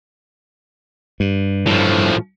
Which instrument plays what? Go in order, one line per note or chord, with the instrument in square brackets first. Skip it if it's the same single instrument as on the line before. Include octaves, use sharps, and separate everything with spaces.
[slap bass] G2
[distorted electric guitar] A2 F3